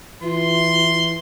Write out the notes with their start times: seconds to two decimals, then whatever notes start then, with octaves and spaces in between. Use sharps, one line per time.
0.22 E3 F4 C6